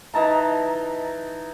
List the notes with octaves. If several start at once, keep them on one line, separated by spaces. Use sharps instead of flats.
E3 D#4 A5 A#5